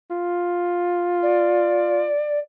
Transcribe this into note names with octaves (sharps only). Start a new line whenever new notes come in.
F4
D5